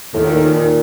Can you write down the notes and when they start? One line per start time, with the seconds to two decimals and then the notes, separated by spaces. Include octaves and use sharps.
0.14 D#2 A2 D#3
0.24 A#2
0.34 A2
0.44 A#2